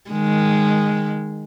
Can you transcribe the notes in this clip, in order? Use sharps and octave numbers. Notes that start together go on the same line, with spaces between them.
D#3 G#3